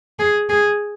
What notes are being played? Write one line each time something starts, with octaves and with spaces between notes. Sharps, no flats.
G#4
G#4